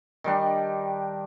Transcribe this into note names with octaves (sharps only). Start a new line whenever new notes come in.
D#3 G3 D4